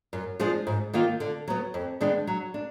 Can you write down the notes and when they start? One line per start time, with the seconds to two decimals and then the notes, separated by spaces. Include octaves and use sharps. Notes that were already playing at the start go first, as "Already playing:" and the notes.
0.13 F#2
0.39 F3 G#3 D4 G#4
0.67 G#2
0.93 D#3 A#3 F4
1.20 D3
1.48 F#3 B3
1.74 F2
2.01 D#3 G#3 B3 D4
2.27 F#3
2.54 D4